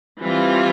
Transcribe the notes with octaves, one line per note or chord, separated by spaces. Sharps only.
E3 G3 C4 F4